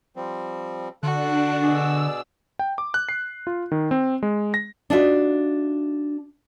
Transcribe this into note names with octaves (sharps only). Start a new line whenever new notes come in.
F3 G3 C4
D3 D4 F#4 A4 F#6
B2 G#4 D5 E6
G5
D6
F#6
C7
F4
D#3
C4
G#3
A#6
D4 D#4 F4 F#4 E5